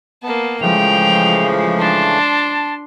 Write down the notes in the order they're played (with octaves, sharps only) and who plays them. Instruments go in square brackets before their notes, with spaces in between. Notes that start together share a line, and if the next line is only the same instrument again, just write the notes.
[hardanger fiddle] A#3 A5 [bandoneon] B3
[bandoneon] C#3 E3 A3 [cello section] F3 G#3 [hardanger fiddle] G5 [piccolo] F7
[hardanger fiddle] D4 C6 [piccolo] A5